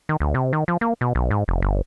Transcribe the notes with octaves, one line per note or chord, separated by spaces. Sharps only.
D#3
D2
C3
D#3
F3
A#3
B2
B1
G#2
F1
G1